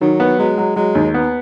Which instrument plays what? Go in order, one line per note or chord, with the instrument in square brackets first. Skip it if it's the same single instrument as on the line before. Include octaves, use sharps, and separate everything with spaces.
[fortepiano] D#3 [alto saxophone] F#3
[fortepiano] B3
[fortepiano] F#3 [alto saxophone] G#3
[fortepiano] F#3
[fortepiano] F#3 [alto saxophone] G#3
[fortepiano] D#2
B3